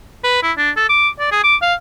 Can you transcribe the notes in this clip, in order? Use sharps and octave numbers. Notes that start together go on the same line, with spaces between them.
B4
E4
D4
A4
D6
D5
G#4
D6
F5